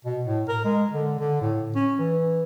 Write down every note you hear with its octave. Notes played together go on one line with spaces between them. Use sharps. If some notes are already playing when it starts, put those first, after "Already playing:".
B2
A2
A#4
G#3
D3
D3
A2
C#4
E3